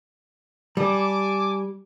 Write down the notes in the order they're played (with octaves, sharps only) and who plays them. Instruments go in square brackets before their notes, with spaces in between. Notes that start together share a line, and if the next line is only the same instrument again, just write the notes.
[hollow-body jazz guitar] G3 [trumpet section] G#5 A5 D6